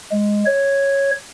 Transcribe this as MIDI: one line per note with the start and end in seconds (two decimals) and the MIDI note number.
0.12 0.44 56
0.46 1.11 73